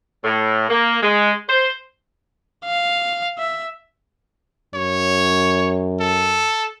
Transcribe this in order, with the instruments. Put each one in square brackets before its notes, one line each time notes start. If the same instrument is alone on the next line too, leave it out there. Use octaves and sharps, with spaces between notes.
[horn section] A2
A#3
G#3
C5
[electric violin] F5
E5
[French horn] F#2 [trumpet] C#5
[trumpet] A4